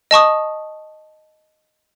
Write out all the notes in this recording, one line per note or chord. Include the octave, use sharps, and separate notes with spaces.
D#5 A5 C#6 D#6